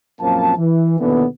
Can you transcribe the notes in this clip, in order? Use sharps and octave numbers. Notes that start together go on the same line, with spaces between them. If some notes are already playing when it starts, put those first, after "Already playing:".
A#1 F#2 F3 A#3 C4 A5
E3
D#2 B2 D3 E3 B3